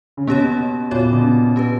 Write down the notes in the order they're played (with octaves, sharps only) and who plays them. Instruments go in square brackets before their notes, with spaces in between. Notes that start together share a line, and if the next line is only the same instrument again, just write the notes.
[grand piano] C#3
[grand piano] B2 [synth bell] A#3 C#4 G4 C#5
[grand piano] A#2 [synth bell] B3 F#4 C#5
[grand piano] A#2
B2
C#3
[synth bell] C#4 G4 B4